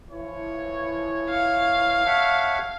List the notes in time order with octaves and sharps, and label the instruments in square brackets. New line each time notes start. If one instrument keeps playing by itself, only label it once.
[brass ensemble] E3 F3 C#5
[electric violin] F5
[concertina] C#5 E5 F#5 [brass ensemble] A5